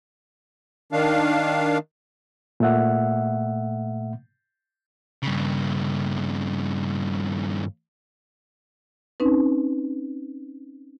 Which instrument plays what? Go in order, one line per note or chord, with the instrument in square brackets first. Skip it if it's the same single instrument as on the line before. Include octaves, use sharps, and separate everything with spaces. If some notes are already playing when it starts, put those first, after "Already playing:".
[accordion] D#3 D4 F5
[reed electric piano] A#2 A3 E5 F#5
[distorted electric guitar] G2 C#3
[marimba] C4 C#4 D#4 B4